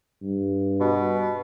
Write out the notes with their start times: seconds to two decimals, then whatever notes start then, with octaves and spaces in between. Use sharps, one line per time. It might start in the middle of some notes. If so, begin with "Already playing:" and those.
0.22 G2
0.80 B2